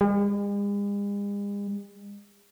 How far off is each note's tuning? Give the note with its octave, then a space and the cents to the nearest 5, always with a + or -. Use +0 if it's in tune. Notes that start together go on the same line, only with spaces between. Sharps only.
G#3 -45